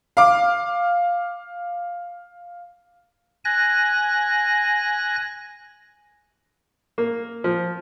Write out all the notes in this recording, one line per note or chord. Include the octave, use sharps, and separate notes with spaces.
F5 D6
G#5 F#6 A#6
A#3
F3